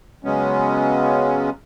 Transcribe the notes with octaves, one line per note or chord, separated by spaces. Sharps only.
C#3 F#3 G#3 B3 C#4